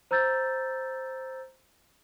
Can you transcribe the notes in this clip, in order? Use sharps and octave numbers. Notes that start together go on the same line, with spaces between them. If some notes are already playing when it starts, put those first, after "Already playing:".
C5 A#5 E6 G6 A6